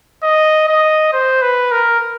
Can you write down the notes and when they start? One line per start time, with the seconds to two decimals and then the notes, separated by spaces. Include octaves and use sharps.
0.23 D#5
0.68 D#5
1.13 C5
1.42 B4
1.72 A#4